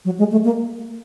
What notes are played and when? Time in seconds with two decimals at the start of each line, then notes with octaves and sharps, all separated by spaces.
0.05 F#3
0.19 G#3
0.32 A3
0.45 A#3